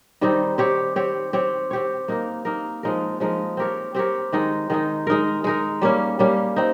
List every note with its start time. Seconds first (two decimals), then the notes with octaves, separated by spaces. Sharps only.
0.21 D#3 G3 C4 D#4
0.58 C4 G4 C#5
0.96 C4 G4 C#5
1.33 C4 G4 C#5
1.71 C4 G4 C#5
2.08 A#3 D#4 A#4
2.45 A#3 D#4 A#4
2.83 F3 G#3 D#4 A#4
3.20 F3 G#3 D#4 A#4
3.57 C4 G4 A#4 C#5
3.95 C4 G4 A#4 C#5
4.33 D#3 G#3 D#4
4.70 D#3 G#3 D#4
5.07 G#3 D#4 A#4
5.44 G#3 D#4 A#4
5.82 G3 A#3 C#4
6.19 G3 A#3 C#4
6.56 C4 D#4